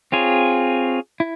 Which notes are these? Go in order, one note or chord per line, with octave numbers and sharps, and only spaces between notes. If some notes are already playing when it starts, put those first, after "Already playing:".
C4 F4 G#4 C#5
E4